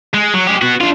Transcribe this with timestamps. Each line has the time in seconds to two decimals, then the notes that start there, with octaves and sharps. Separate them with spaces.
0.14 G#3
0.33 F#3
0.47 G#3 G4
0.61 B3 F#4
0.81 D4 F4